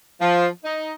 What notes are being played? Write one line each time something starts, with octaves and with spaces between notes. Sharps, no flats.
F3
D#4